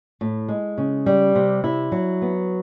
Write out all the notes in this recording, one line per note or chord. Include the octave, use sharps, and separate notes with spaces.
A2
G#3
C#3
G3
C3
E4
F#3
B3